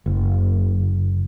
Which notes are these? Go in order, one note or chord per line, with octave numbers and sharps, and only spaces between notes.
F#1